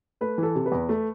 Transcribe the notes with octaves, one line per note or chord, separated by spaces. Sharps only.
A3 B4
E3
A4
C3
B4
E2
A3